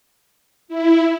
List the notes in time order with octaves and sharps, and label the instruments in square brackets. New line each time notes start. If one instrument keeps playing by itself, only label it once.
[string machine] E4